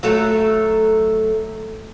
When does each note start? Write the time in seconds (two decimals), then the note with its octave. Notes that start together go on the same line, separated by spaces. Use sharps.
0.03 F#3 A3 A4